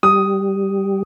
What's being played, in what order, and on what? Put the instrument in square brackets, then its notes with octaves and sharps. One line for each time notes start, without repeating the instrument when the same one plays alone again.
[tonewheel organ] G3 [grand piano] D#6